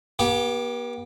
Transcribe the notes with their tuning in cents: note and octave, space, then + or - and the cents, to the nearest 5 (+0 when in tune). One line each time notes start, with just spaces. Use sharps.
B3 -45 G4 +0